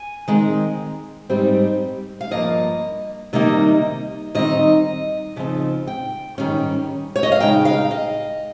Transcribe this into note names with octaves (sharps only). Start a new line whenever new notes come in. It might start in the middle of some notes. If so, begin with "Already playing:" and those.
Already playing: G#5
D#3 G#3 C4
G#2 G3 C4 D#4
F5
G2 F3 A#3 D#5
C3 D#3 G3 A#3 D#4 D#5
D#3 G3 C4 D#4 D#5
C#3 F3 C4 D#4
G5
G#2 D#3 G3 C#4
C#5
D#5
F5
C#3 G#3 D#4 G5
F5
D#5